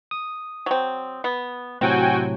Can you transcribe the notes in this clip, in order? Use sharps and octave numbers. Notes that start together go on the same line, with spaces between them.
D#6
F#3 C4
B3
A2 C3 F#3 C4 F#4 G5 G#5